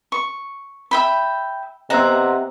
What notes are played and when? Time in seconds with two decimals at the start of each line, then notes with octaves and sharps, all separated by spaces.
0.12 C#6
0.91 E5 G5 B5
1.90 C3 B3 D#5 F#5 A#5